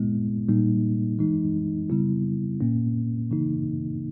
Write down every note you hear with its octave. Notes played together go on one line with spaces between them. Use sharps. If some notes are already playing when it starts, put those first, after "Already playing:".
Already playing: A#2 G#3 B3 E4
A#2 G3 A#3 D#4
E3 G#3 D#4
C#3 G3 B3 E4
A#2 A#3 C#4
C#3 E3 A#3 D#4